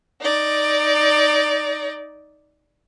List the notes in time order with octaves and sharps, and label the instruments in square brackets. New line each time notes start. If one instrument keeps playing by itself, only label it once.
[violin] D#4 D5